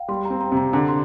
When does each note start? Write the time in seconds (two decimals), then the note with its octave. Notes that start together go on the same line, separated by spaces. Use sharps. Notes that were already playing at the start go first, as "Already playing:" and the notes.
Already playing: F5 G5
0.08 G3 C6
0.25 A#5
0.30 C4
0.41 A#5
0.52 C3
0.57 A#5
0.73 D3 A#5
0.88 C6